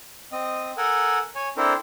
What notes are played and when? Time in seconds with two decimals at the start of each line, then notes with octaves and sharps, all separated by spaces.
0.32 C4 D#5
0.78 A4 A#4 F#5 G#5
1.35 C#5 G#5
1.57 C4 D4 E4 A4 A#4 C5